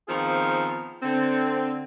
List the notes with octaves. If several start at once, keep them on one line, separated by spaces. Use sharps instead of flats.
D#3 F3 B3 C4 F4 G#4
D3 C4